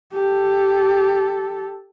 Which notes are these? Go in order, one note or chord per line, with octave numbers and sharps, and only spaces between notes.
G4 A4